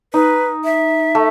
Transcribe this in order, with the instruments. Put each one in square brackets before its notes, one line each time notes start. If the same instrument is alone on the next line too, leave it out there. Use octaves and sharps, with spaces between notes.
[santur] D#4 [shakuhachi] B4
[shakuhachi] E5
[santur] A3